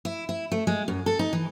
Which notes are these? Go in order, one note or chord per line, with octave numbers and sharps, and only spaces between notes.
E4
E4
A3
G#3
F#2
A4
D#4
E3